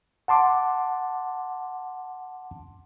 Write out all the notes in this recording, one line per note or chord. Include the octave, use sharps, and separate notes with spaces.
F#5 A5 C6 D6